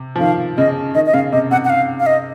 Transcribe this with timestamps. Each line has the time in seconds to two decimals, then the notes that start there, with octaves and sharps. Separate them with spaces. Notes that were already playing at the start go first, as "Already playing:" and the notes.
Already playing: C3
0.16 F3
0.20 D#3 F5
0.58 C#3 D#5
0.95 D#3 D#5
1.06 D#5
1.14 C#3 F5
1.32 C3 D#5
1.51 C3 F#5
1.65 F#5
1.70 F5
2.00 F5
2.06 D#5